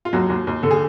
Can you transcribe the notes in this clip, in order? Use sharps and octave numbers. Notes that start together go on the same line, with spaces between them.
F4
D#2 F#3 F#4
D#2
D#2
D3 A4
G#4